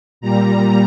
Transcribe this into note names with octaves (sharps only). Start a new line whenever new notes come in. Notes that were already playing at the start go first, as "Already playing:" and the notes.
A#2 G3 A#5